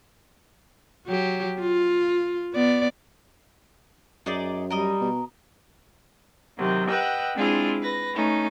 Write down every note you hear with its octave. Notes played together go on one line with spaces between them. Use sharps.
F#3 G4
F4
B3 D5
F#2 D#4 G#4 D5
G3 A#4 D#5 D#6
B2
C3 D#3 F#3
B4 D#5 F#5 G5 E6
G#3 C4 D4 E4 F4 G#4
B4 A#6
A3 C#4 D#4